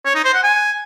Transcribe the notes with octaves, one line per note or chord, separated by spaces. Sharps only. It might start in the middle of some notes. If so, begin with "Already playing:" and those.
C#5
D#4
C5
F#5
G#5